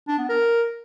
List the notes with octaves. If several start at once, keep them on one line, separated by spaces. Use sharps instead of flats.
D4
B3
A#4